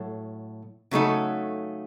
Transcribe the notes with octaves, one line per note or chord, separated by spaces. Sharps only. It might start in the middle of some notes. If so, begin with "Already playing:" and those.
Already playing: A2 F#3 A4
C#3 F#3 A3 D#4 A4